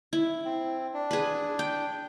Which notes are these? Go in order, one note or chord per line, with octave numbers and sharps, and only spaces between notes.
E4
C4
D4
G#4 B4
G5